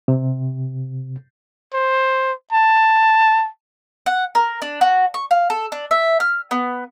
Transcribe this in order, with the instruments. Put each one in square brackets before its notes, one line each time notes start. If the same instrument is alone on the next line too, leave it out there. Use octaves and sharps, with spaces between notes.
[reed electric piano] C3
[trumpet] C5
A5
[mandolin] F#5
A#4
D4
F#4
C#6
F5
A4
D4
E5
F6
B3